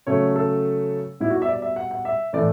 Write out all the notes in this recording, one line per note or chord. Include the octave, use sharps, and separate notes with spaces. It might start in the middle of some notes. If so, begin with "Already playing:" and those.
C#3 F#3 A3 C#5
A4
B2 G3 E4
F#4
E5
D5
E5
F#5
F#5
E5
A2 E3 A3 D5